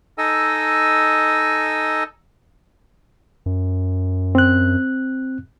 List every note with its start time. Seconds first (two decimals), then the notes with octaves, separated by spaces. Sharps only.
0.18 D#4 A4 D#5 G#5 E6
3.46 F#2
4.35 C4 F#6